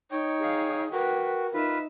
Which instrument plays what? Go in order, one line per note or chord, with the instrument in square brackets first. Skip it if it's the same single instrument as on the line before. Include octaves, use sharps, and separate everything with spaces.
[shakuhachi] D#4 [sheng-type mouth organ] C#5 G5
[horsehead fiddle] G#4 F5
[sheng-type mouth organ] F#4 [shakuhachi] A#4 [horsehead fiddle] B4 G5
[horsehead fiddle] D#4 E5 [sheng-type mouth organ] F4 B4